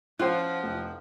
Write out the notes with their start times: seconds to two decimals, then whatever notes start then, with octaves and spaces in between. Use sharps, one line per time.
0.19 F3 C#4 F4 C5 F#5 G5 F#6
0.63 F1